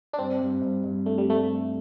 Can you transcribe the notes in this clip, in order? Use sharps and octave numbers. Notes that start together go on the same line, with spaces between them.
D4
G2 C4
G2
G2
G2
A3 D4
G3
G2 A3
G2